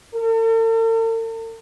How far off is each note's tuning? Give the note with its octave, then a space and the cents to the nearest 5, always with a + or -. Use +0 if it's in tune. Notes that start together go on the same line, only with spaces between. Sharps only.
A4 +45